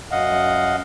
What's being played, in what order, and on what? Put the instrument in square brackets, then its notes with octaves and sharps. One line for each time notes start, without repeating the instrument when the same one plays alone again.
[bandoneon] F#2 D#5 F5 F#5